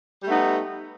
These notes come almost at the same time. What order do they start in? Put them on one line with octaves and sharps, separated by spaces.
G3 A3 D#4 B3